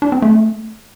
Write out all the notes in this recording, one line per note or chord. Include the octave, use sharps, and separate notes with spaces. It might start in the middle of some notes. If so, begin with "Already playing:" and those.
D4
C4
A3